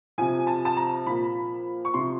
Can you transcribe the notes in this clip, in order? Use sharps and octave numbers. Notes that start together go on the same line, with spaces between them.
C3 F3 G#5
A5
A5
A#5
A#2 F3 B5
C#6
C3 F3 C6